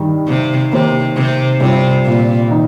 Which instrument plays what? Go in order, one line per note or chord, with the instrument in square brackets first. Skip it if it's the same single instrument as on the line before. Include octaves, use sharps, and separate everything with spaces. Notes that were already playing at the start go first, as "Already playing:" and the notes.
Already playing: [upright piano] G2 D#3 G3
[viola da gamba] C3
[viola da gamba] C3 [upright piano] D#3 A#3 G4 C5
[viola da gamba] C3
[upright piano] G2 G3 C4 F4 C5 [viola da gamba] C3
[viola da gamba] A#2
[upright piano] D#3 C4 D#4